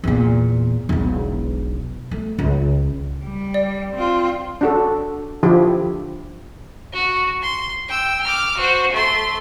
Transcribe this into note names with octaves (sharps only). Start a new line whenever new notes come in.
E2 A#2
E1 B1
A3
C#2
G3
D5
C4 F4
D4 F#4 A4
D3 F3 E4 G4
F#4
C6
G5 E6
D6 F6
F#4 C5
A3 C6